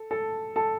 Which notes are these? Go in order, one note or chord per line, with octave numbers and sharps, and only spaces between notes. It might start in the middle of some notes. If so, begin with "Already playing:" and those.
Already playing: A4
A4 A5
A4 A5